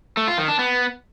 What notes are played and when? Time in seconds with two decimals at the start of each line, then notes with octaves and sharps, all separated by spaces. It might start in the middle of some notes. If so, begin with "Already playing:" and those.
0.17 A3
0.28 F4
0.38 D#3
0.48 D4
0.59 B3